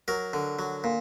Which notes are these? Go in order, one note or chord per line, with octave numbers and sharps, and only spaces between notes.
F#3 A#4
D3
F#3
A#2